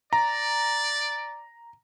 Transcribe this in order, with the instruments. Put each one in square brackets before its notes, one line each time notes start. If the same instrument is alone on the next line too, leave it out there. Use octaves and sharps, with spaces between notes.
[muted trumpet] D5 [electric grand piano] A#5